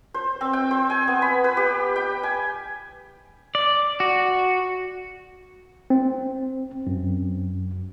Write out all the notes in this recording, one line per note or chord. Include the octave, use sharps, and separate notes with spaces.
C5
C4
G5
C5
G#5
B3
B5
B4
G4
G5
G#5
D5
F#4
C4
F#2